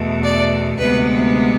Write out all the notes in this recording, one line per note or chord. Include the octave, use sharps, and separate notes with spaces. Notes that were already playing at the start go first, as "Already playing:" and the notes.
Already playing: E2 B2 A3
D5
D2 C3 G#3 B3 B4